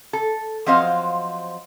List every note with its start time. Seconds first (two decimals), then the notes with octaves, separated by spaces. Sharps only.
0.13 A4
0.66 F3 F#3 C4 C5 D#5 F5